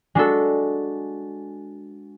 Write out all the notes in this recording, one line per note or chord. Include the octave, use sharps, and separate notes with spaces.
G#3 D4 F#4 A4